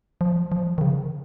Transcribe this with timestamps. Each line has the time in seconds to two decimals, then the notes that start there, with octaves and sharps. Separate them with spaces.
0.21 F3
0.52 F3
0.78 D#3
0.81 C#3